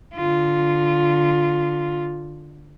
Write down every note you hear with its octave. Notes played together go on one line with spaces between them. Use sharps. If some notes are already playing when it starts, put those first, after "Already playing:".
D3 F4